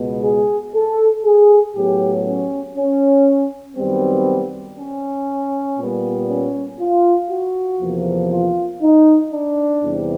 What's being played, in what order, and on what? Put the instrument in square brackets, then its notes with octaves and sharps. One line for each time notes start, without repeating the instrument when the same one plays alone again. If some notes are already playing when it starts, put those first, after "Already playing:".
Already playing: [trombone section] C#2 B2 G#3 B3
G#4
A4
G#4
A2 F#3 B3 G4
C#4
C#4
F#2 D#3 G3 B3 C4
C#4
A#2 G3 B3
C#4
F4
F#4
E2 C3 F3 A#3
F4
D#4
D4
E2 C3 E3 G3